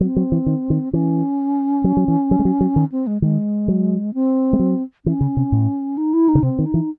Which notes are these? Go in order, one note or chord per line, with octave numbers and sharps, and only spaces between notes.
F#3 C4
F#3
E3
D#3
D#3
E3 C#4
F#3
F#3
E3
F#3
G#3
F#3
F#3
D#3
C4
G#3
D#3 G#3
F#3
C4
G#3
F#3
E3 C#4
C#3
C3
A2
D#4
E4
D#4
C#3
C3 C4
D#3
D#4
E3